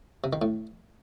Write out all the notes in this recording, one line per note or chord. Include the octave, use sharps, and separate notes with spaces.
C3
D#3
A2